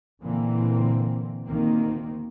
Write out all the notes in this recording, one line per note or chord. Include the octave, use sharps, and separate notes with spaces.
A#2 D3 E3 A#3 C4
D2 D#3 A#3 C4